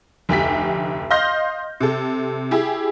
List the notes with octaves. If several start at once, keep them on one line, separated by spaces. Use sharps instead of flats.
F1 D2 G4 B6
D#5 F5 C6 F6 G6 A#6
C3 A4
E4 G4 G#4